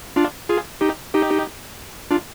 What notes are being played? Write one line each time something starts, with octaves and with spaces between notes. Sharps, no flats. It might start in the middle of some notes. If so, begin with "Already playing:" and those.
D4 F4
F4 G#4
D#4 G4
D#4 G4
D4 F4